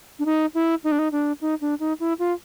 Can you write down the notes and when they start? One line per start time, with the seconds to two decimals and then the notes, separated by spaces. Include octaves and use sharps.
0.19 D4
0.26 D#4
0.55 E4
0.84 D#4
0.92 D4
0.99 D#4
1.12 D4
1.41 D#4
1.61 D4
1.80 D#4
2.00 E4
2.19 F4